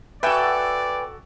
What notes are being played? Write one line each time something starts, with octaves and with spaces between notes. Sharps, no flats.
F#4 A4 B4 D5 E5 G5 G#5